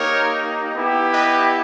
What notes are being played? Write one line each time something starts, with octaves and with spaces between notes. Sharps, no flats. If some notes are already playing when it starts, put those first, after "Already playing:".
Already playing: A#3 D#4 G4 A#4 C#5
B3 E4 G4
B4 D#5